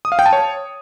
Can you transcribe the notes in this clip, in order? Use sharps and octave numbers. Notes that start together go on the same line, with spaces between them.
D#6
F5
G5
A5
C#5